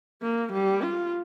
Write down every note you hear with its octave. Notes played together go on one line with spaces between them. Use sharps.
A#3
G3
F4